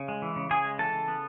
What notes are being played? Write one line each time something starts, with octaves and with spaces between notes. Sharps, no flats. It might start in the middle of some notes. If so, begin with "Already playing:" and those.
Already playing: C#3
G#3
E3
C#3
C#3 G#4 G#5
G#3
E3 A4 A5
C#3
B3